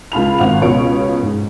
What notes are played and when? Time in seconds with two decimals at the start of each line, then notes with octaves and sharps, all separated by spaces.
0.12 C#2 F4 B5 F7
0.38 G#1 F5 F#5 F7
0.62 C#2 B2 C#5 C#7 D7
1.22 G#2